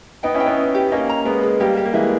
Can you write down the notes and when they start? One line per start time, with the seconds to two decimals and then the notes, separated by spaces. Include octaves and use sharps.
0.23 B3 D#4 G5
0.34 C#4 E4
0.40 G5
0.46 B3 D#4
0.58 C#4
0.75 G4
0.92 A#3 C#4 D#5
1.09 A#5
1.25 G#3 B3 E4
1.43 G#4
1.60 G3 A#3 G4
1.77 G4
1.85 A#3
1.93 E3 G#3 E5